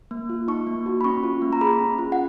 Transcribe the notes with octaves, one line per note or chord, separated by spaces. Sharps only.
A#3
F4
D#4 C#6
A#3
F#4
B5
C#4 C#6
F4
A#3
A#5
G#4 B5
C#4
F4
F#5